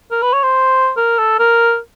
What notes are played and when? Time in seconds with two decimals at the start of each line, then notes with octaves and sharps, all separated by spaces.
0.11 A#4
0.22 B4
0.33 C#5
0.43 C5
0.97 A#4
1.19 A4
1.39 A#4